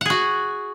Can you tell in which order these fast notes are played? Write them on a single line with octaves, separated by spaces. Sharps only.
F#5 G#4 F#4